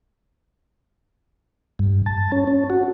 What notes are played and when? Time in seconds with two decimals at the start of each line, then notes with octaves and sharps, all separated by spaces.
1.79 G2
2.06 A5
2.32 C#4
2.47 C#4
2.70 F#4